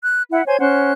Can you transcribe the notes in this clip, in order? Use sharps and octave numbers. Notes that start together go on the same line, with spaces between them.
F#6
E4 E5 F#5
C5 C#5 G#5 G#6
C#4 C5 F#5 F#6